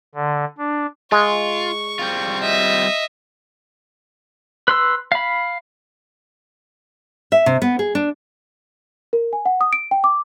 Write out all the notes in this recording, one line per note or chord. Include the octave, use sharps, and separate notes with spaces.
D3
D4
G#3 F4 C#6
G3 C4 F4
D#5 E5
B4 C6 E6
F5 B5
E5
C3
B3
G#4
D4
A#4
G#5
F#5
D#6
D7
G5
D6